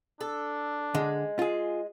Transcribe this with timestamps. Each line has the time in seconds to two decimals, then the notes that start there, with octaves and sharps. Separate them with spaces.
0.21 D4 A4
0.95 D3 G#3
1.39 F4 G#4